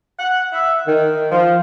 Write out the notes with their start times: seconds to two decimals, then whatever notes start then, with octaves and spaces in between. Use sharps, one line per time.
0.19 F#5
0.53 E5
0.86 D#3
1.31 F3